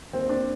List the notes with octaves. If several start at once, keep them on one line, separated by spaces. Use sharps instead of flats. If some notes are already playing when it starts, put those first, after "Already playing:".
D#2 D#3 C4
D4